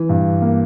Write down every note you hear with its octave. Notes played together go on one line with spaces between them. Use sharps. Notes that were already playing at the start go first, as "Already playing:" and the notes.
Already playing: E3
G2
A#3